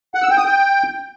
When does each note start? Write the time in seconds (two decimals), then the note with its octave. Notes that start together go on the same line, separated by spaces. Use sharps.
0.14 F#5
0.22 E6
0.30 G5
0.37 D#6
0.45 G5